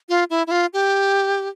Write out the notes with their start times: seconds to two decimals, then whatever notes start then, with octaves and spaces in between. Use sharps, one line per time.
0.09 F4
0.30 E4
0.47 E4
0.51 F4
0.73 G4